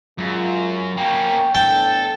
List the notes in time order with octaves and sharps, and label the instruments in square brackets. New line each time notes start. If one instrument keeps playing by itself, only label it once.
[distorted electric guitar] F#2 [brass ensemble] G#3 F4
[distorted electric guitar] A#3 C#4 [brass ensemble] G5
[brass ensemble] A2 B3 D4 [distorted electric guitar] A4 [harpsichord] G5